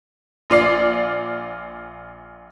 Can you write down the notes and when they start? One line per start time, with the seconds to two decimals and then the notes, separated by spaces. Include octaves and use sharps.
0.50 A#1 F4 D5 C7